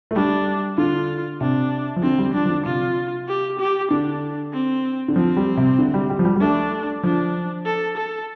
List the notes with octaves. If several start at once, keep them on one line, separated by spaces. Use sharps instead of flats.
A3
G3 D4
D3 F4
C3 D4
F3
D3 C4
G3
F3 D4
F3
D3
C3 F4
G4
G4
D3 D4
C4
D3
F3 C4
G3
C3
D3
G3
G3
F3
G3
G3
A3 D4
F3 D4
A4
A4